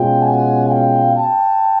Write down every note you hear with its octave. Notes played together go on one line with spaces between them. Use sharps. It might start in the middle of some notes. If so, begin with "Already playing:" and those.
Already playing: B2 G#3 C#4 F4 G5
F#5 G#5
F5 G5
G5 A5